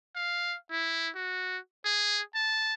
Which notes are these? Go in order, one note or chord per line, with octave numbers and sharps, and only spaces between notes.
F5
E4
F#4
G#4
A5